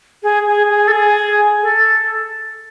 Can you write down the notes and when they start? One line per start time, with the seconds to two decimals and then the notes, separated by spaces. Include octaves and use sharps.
0.23 G#4
0.46 G#4
0.70 G#4
0.88 A4
0.92 G#4
1.62 A4